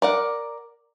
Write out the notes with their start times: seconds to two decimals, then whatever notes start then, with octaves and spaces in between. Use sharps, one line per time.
0.02 A#4 D5 F#5